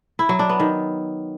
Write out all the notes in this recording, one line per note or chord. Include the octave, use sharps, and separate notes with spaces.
E4
F#3
D4
B3
D#3